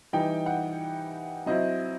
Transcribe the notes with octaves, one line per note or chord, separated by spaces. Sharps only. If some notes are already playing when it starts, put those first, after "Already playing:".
E3 G3 D#4 G5
F#5
F#3 C4 E4 D#5